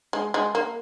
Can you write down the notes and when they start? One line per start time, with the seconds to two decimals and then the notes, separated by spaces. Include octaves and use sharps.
0.13 G#3
0.34 G#3
0.55 A#3